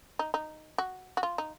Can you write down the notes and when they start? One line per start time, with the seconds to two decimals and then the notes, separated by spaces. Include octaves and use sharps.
0.19 D#4
0.34 D#4
0.78 F#4
1.17 F#4
1.23 F4
1.38 D#4